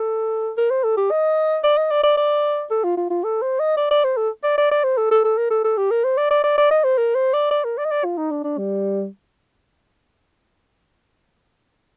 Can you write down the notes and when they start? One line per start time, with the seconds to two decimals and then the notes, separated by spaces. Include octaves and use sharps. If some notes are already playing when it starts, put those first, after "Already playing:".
Already playing: A4
0.57 A#4
0.70 C5
0.84 A4
0.97 G4
1.10 D#5
1.64 D5
1.77 D#5
1.90 D5
2.03 D5
2.17 D5
2.71 A4
2.84 F4
2.97 F4
3.10 F4
3.24 A4
3.42 C5
3.59 D#5
3.77 D5
3.91 D5
4.04 C5
4.17 A4
4.43 D5
4.57 D5
4.71 D5
4.84 C5
4.97 A4
5.11 A4
5.24 A4
5.38 A#4
5.50 A4
5.64 A4
5.77 G4
5.91 A#4
6.04 C5
6.17 D5
6.31 D5
6.44 D5
6.58 D5
6.71 D#5
6.84 C5
6.98 A#4
7.15 C5
7.33 D5
7.51 D5
7.64 A#4
7.78 D5
7.84 D#5
7.91 D5
8.04 F4
8.18 D#4
8.31 D4
8.44 D4
8.58 G3